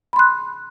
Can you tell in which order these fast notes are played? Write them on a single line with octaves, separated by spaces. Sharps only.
B5 C6 F#6